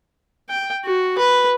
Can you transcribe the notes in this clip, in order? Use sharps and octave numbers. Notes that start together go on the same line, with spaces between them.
G5
F#4
B4